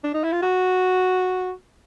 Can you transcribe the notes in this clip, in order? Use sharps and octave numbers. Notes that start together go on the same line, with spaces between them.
D4
D#4
E4
F4
F#4